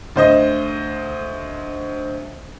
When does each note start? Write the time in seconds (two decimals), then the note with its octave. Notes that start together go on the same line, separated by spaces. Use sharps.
0.16 D2 C5 D#5